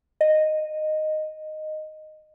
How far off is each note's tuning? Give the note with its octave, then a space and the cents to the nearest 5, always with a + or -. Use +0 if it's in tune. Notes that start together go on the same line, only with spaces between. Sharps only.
D#5 -10